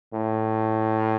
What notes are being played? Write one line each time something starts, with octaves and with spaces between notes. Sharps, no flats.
A2